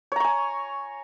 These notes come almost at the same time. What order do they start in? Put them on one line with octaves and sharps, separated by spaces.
C#5 A#5 C#6 G#5